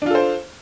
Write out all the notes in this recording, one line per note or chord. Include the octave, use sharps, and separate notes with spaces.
D4 F4 A4 C5